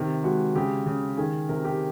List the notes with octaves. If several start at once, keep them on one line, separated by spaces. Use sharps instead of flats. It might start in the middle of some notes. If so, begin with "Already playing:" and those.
Already playing: C3 D#3
G#3 F#4
C#3 G4
C#3
D#3 G#4
C3 A#4
G4